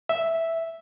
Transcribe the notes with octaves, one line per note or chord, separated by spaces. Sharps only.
E5